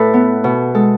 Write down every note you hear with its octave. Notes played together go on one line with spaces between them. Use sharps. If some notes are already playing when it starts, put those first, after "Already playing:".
Already playing: A2 A4 B4
B3
B2
G#3 A4